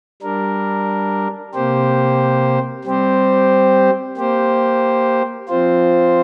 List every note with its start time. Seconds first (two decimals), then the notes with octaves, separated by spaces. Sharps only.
0.22 G3 D4 A#4
1.54 C3 A#3 G4 C5
2.85 G3 C4 G4 C5
4.17 A#3 G4 C5
5.48 F3 C4 F4 C5